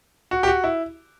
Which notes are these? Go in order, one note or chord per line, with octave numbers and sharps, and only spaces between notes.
F#4
G4
F#4
E4